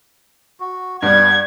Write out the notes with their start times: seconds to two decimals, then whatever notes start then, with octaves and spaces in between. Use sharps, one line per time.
0.60 F#4
1.02 G2 G3 B3 G#6